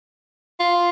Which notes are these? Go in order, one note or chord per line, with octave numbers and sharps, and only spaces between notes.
F4